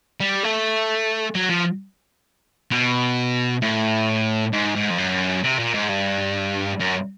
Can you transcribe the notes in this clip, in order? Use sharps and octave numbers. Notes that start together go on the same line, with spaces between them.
G3
A3
F#3
F3
B2
A2
G#2
G#2
F2
F#2
C3
A#2
G#2
G2
F#2